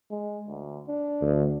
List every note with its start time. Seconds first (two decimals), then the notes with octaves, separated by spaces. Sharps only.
0.11 G#3
0.48 D2
0.88 D4
1.22 D2